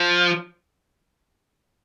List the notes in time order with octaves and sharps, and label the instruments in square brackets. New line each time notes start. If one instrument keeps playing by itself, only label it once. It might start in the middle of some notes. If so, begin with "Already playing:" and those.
Already playing: [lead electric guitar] F3